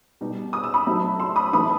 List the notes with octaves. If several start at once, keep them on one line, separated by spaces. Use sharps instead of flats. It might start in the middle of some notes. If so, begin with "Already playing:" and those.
B2 G3 D#4
D#6
E6
B5 D#6
F#3 A3 D#4
C6 E6
B5 D#6
E3 A3 D#4 B5 D#6